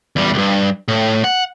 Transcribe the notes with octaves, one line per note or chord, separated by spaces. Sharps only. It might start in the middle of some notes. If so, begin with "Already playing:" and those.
E2 G3
C2 G2
A2
F#5